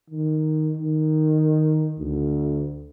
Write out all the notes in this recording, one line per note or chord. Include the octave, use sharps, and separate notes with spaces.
D#3
D#3
D2